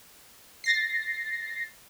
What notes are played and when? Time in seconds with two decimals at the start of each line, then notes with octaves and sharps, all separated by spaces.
0.64 A6 A#6 C7